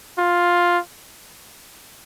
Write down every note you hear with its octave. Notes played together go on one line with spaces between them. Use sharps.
F4